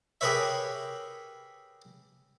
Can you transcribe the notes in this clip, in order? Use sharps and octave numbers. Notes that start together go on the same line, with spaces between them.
G4 G#4 A#4 B4 C#5 E5